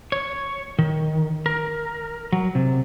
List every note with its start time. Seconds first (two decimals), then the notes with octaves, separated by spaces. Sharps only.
0.12 C#5
0.79 D#3
1.46 A#4
2.32 F#3
2.55 C3